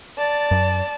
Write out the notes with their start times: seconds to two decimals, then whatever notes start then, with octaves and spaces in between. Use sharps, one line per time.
0.18 D5 A5
0.51 F#2